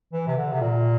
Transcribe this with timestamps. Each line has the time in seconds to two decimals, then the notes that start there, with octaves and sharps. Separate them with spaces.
0.13 E3
0.27 C3
0.37 D3
0.52 C3
0.61 A#2